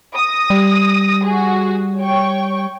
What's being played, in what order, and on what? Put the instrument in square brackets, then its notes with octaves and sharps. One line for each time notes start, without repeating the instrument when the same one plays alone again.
[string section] D#6 A#6
[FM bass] G3
[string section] F#4 G#4
C#5 G5 C#6